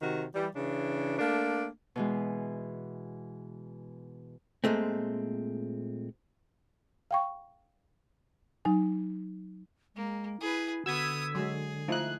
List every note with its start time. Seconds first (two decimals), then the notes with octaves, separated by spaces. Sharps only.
0.02 C3 D#3 F#4
0.35 E3 G3
0.56 C#3 E3 D4
1.19 A3 A#3 D4
1.96 B2 E3 G#3
4.64 A#2 G#3 A3 C4
7.11 F5 G5 C#6
8.65 F#3 D#4 G#5
9.96 G#3 A#3
10.41 E4 G#4 B4
10.86 D3 B3 F#4 D#6 E6 G#6 B6
11.35 F#3 G#3 G#4
11.88 F3 A3 D#4 E4 F#6